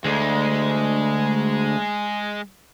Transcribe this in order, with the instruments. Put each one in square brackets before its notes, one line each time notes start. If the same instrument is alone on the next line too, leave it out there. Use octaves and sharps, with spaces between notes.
[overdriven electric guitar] D2 [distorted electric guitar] G#3